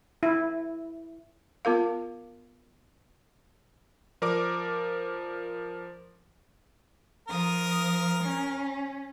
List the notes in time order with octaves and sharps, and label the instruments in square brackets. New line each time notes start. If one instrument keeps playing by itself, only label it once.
[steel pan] E4
[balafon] B3 F4 A#4 F5
[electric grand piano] F3 A#4 D5 D6
[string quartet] F3 D#6 [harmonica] A#4
[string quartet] C#4